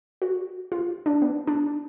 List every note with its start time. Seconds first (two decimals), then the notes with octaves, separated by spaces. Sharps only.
0.22 F#4
0.72 F4
1.06 D4
1.22 B3
1.47 D4